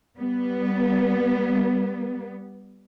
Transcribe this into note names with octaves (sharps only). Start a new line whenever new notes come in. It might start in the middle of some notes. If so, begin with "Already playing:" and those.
G3 B3